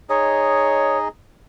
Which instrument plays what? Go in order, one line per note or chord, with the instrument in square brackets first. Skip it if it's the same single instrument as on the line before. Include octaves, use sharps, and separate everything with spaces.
[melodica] D#4 G#4 D#5 [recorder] C#5